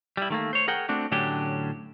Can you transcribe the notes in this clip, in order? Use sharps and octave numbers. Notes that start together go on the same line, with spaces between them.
G3 E4
D#3 A3 A#3
C5 C#5
G#4 A#4 F#5 G5
A3 C4 D4 F#4
A2 D3 F#3 C#4 D4 G4